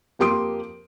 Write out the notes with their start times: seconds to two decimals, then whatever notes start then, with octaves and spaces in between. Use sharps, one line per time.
0.19 F2 A#3 G4 C6 D#6 D7